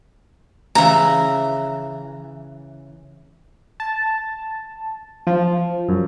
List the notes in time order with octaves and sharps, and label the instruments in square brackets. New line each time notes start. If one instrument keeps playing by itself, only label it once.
[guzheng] C#3 E3 [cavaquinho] E5 A#5
[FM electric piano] A5
F3
F#2